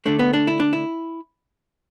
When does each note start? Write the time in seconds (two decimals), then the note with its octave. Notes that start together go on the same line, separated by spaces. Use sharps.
0.06 D3 A3 D4
0.19 B3
0.33 D4
0.47 E4
0.60 D4
0.73 E4